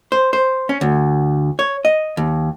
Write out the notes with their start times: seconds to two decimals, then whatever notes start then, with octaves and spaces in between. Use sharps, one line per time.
0.12 C5
0.33 C5
0.69 C#4
0.81 D2
1.59 C#5
1.85 D#5
2.17 D#2